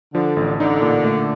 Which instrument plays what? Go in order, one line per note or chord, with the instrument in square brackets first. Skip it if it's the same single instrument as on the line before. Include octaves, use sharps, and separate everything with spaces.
[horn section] D3 [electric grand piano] F3
[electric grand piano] A1
[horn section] D3 [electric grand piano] D#4
[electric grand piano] A#2
A3